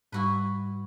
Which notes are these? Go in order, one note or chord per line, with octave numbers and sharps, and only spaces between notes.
G#2 G3 E4 F#4 B4